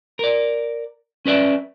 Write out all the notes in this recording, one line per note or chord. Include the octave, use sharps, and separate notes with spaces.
A#4 D5
C#4 B4 D5 E5